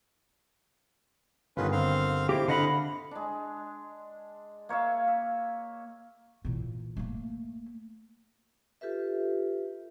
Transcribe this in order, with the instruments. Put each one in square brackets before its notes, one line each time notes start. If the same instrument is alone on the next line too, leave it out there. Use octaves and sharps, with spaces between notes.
[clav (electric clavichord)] G1 G2 D#3 [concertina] C#4 F4 B4
[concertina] C4 F5
[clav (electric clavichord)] C4 E4 [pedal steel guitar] G4 [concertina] D6
[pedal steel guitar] D3 D#5 B5 [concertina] F5 F#5
[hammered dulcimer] G#3 D4
A#3 C#5 E5 F5
E5
[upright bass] A#2 E3
A3 A#3
[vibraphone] F4 G4 A4 B4 E5